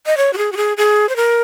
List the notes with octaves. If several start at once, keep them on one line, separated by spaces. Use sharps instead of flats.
D#5
C#5
F#4
G#4
F#4
G#4
G#4
C5
A#4